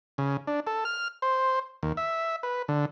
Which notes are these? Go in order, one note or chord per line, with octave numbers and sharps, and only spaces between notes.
C#3
D4
A4
F6
C5
D#2
E5
B4
D3